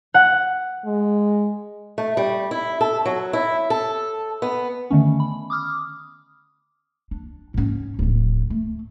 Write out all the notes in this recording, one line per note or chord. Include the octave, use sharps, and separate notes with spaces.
F#5
G#3
A3
G3
E4
A4
F#3
E4
A4
B3
D3 D#3 A3 B3 C#4
B5
D6 D#6 F6
D4
G#2 C#4
D1 F3
A3